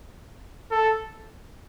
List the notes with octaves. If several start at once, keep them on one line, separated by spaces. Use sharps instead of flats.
A4